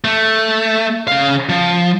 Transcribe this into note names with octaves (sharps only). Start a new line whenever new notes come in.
A3
C#3 F5
F3